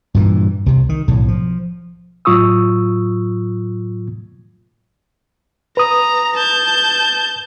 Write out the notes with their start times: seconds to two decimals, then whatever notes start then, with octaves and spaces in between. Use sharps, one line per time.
0.15 G2 A#2 D#3 E3
0.66 C2 C3
0.89 D#3
1.08 B1 A2
1.28 F3
2.25 A2 F#3 F4 C#6 D#6 E6
5.77 B4 A#5 D#6
6.37 A5 G6